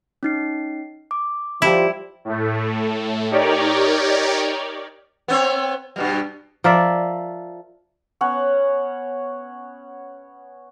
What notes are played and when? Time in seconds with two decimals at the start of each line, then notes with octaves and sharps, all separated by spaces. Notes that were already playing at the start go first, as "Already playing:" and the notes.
0.23 C#4 D#4 C7
1.11 D6
1.62 F3 G3 E4
2.25 A2 A3
3.31 D#4 G4 A#4 C#5 D5
5.28 B3 C4 C#5
5.96 G2 B2 G3
6.64 F3 A#4 D5 E5
8.21 B3 C#4 C#5 F#5